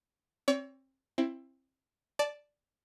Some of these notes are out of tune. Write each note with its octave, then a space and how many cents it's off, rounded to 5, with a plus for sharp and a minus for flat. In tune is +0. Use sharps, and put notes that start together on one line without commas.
C4 +30 C#5 +40
C4 +25 E4 +20
D5 +0 A5 -15